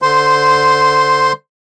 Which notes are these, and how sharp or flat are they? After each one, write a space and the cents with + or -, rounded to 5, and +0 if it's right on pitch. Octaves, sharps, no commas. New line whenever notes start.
D3 +0 C5 -10 C6 +0